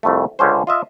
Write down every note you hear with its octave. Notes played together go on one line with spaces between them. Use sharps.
C2 F2 A3
C#2 D3 C#4 C5
F4 D#5 E5